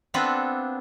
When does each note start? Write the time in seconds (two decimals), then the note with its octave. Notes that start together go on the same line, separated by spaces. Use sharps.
0.14 B3 C4 D4 F4 A4 B4